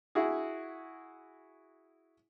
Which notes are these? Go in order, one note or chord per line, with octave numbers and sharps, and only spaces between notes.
E4 F#4 G#4